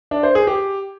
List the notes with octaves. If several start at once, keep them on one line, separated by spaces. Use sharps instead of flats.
D4
C5
G#4
G4